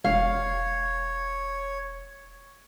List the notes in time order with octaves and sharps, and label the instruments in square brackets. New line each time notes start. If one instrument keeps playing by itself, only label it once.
[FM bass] E1 [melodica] C#5 [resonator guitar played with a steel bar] F5